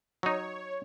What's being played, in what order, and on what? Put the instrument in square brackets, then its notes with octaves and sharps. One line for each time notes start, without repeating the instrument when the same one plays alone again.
[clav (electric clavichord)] F#3 D#4 [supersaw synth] C#5